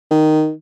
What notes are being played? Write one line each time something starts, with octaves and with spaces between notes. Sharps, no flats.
D#3